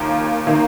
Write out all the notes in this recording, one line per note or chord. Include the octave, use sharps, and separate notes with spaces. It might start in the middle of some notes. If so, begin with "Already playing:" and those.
Already playing: D#2 D#3 A#3 F4
D#3 A#3